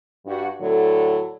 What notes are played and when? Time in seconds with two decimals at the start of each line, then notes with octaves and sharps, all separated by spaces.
0.25 G2 F#4
0.60 A2 D3 F#3 A4